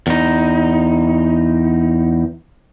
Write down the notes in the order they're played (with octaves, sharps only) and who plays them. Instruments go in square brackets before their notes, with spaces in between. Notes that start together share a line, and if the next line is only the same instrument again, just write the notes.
[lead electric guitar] E2 D#4